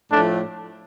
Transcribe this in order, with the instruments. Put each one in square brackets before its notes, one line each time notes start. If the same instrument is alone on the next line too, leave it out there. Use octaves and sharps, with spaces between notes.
[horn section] A2 F3 A3 D4